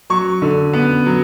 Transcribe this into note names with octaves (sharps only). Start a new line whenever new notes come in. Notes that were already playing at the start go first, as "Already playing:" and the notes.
F#3 C#6
D3
B3
F#3